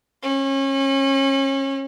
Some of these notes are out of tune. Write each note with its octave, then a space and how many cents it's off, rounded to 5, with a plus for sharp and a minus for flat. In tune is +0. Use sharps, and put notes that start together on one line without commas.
C#4 -30